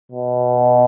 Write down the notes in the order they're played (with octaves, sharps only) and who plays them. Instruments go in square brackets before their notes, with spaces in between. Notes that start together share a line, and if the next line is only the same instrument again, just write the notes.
[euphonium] B2